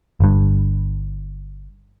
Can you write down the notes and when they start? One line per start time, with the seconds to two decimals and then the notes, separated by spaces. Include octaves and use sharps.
0.20 G1 G2